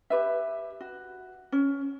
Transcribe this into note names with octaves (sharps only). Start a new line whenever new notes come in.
G4 B4 E5
F#4
C#4